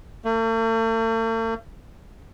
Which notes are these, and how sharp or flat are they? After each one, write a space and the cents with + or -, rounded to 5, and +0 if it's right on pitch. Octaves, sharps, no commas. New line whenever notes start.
A3 +45